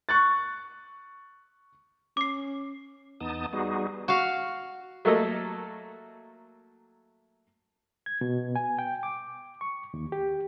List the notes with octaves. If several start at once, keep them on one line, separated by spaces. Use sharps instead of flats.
C#6 F#6 A6
C#4 D6 C7
E2 B3 D#4 A5 D#6
G3 B3 D#4 F#4 G#4
F#4 F5
F#3 A3 A#3 A4 D#5
G#6
B2
G#5
G5
D6
C#6
D#2
G4